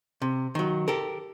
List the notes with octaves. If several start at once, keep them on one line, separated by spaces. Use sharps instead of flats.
C3
D#3 F#3
G4 A4 A#4